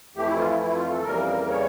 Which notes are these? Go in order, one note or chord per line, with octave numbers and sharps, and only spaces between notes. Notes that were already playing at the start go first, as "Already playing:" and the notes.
F2 E3 A3 G4
E4
F4
E4
E4
F4
A4
F2 C#3 E3 G3 A#3 A#4
A#4
C#5